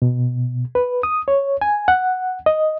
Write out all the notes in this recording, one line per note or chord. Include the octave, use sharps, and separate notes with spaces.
B2
B4
D#6
C#5
G#5
F#5
D#5